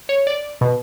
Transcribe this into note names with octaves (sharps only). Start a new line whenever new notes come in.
C#5
D5
B2